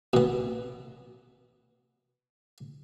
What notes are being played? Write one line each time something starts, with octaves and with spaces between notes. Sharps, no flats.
B2 B3